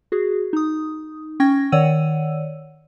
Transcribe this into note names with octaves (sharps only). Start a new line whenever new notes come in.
F#4 G#4
D#4 D#6
C#4 G5 C#6 G#6 A#6
D#3 C#5 D5 F#5 E6 D#7